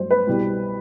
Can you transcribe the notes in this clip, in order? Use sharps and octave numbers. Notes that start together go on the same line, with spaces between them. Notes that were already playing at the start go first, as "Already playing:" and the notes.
Already playing: G2 F#3 A3 C5
B4
C2 B2 G3